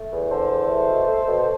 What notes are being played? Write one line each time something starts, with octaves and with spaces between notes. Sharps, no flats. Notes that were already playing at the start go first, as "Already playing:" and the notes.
Already playing: A3
E2
D3 A4 C5
E2
A3
B2
A3
B2